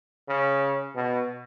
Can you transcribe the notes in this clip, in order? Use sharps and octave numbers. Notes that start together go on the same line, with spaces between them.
C#3
B2